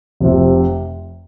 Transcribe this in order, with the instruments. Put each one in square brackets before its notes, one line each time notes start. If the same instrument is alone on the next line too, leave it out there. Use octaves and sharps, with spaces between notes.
[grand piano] F1 F2 C3